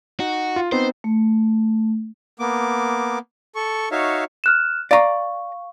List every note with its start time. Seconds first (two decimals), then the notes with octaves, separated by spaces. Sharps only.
0.20 D#4 F#4
0.56 F4
0.72 B3 C4 D#4 C5
1.04 A3
2.40 A#3 B3 D6
3.55 A4 C#6
3.91 D#4 F#4 C#5 E5 F5
4.44 F6 F#6 E7
4.91 D5 F5 A#5 C#6